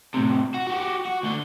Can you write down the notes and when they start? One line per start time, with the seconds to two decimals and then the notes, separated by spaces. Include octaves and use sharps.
0.14 A2 C3
0.54 F#4
0.67 F#4 G4
1.06 F#4
1.23 D2 D3